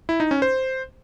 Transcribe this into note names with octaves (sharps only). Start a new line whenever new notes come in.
E4
D#4
C#4
C5